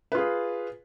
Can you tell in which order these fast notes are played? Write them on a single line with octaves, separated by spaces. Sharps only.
B4 F4 G#4